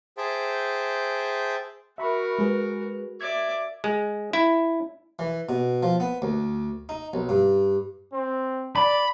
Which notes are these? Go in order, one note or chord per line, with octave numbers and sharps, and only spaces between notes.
G#4 C5 E5 G5 A5
F#4 A#4 E5 B5 C#6
G#3 G#4 B4
D5 E5 G#6
G#3
E4
E3
B2
F3
B3
D2
D#4
B1
G2
C4
D5 B5